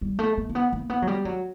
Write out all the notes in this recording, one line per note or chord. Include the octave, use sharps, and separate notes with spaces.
G3
A3
A#3
A#3
B3
A#3
B3
F#3
G3
F#3